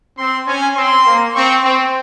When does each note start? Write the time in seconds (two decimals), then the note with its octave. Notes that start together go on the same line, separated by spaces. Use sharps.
0.18 C4 C6
0.47 C#4 G#5
0.76 C4 C6
1.06 A#3
1.35 C4 C#6
1.64 C4 C6